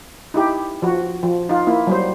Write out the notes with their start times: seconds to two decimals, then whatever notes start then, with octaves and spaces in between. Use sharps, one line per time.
0.34 D#4 E4 G4
0.82 F3 F#4
1.23 F3
1.49 D#4 F4
1.67 A#3 E4
1.87 F#3 G3 C5